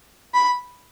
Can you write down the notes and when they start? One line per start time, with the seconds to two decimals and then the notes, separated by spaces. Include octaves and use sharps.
0.34 B5